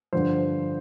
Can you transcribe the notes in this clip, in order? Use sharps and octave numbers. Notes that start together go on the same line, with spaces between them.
G2 D3 F3 C5